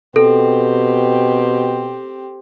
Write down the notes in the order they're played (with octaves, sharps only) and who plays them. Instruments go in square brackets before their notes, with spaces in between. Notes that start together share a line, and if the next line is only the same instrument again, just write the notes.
[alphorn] B2 [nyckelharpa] C4 G4 [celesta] A4